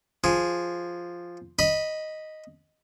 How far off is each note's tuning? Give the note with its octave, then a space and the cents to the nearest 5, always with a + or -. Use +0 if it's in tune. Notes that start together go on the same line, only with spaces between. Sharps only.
F3 +0 G#4 +0
D#5 +0 B5 -10